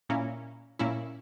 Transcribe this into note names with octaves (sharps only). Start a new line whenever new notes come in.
A#2 A#3 C#4 E4
A#2 A#3 C#4 E4